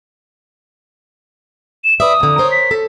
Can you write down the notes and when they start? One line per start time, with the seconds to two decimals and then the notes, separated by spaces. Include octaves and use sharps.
1.84 E7
2.00 B4 D5 E5 D#6
2.20 F2 D3
2.38 A#4 C5 C#5
2.51 B6
2.71 A4